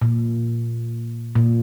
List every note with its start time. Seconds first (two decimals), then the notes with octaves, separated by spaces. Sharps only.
0.02 A#2
1.35 A#2